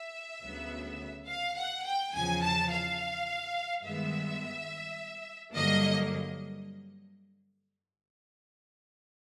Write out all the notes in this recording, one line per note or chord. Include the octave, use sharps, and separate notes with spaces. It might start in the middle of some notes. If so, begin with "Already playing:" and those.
Already playing: E5
D2 C#3 F#3 B3
F5
F#5
G5
E2 C#3 F3 G#5
A5
F5
G2 D#3 G#3 B3 E5
G2 D3 F#3 A#3 D#5